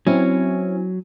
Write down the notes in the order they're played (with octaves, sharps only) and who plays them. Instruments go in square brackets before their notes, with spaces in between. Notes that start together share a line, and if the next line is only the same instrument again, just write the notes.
[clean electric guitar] F#3 [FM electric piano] C4 E4 G#5 [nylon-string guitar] C#4